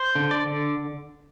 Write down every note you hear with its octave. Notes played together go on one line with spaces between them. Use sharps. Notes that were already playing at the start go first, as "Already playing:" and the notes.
Already playing: C5
D3
D5
D3